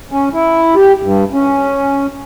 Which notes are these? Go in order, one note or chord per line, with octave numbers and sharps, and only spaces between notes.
C#4
E4
G4
G2
C#4